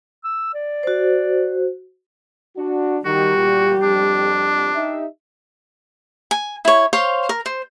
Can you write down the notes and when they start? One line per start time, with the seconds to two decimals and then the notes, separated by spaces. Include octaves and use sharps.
0.24 E6
0.54 D5
0.83 F#4 C5
2.57 D4 F#4
3.05 D#3 G3 F#4 G4
3.37 A#2
3.82 F2 D4
4.74 D#4 G4 E5
6.31 G#5
6.65 E4 C#5
6.93 C5 C#5 F5 C6
7.29 A#4
7.46 C5